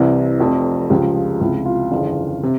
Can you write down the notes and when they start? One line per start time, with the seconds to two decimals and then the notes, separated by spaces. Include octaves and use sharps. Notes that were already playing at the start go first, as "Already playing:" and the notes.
Already playing: C2 C3 E3
0.39 F1 F2 C3
0.90 C#2 C#3 F3 G4
1.16 F4
1.40 C#2 C3 F3 E4
1.65 F4
1.92 G1 F2 C#3 E3
2.43 C3